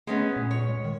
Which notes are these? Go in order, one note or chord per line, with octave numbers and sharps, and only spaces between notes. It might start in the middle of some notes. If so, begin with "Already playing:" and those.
G#3 A3 B3 C#4
A#2
C#5
G#3
D#3